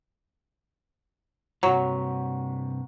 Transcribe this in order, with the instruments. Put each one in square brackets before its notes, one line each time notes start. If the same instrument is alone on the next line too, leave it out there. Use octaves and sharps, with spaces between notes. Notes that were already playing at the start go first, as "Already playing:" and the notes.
[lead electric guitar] G2 C3 [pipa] F#3 [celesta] F#5 A#5 C#6